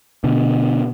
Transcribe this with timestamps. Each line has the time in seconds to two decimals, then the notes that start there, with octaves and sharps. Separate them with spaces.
0.24 B2 D3